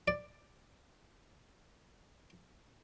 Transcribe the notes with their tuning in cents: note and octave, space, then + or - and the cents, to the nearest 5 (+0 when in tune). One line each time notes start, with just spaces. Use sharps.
D5 +10